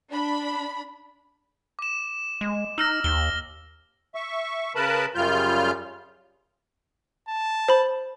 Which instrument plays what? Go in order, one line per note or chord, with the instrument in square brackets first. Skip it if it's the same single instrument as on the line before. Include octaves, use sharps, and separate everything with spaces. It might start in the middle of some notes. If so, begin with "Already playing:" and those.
[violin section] D4 B5
[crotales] D6 E7
[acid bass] G#3
[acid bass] D#4 [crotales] E6 F6 A#6
[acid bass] D#2 [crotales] G7
[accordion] E5 C#6
C#3 A#4 B4 A5 B5
F#2 C#3 G3 F4 F6 G6
[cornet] A5
[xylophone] C5 B5